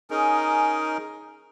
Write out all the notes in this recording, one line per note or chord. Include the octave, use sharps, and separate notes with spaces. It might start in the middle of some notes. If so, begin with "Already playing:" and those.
C#4 D#4 G#4 A#4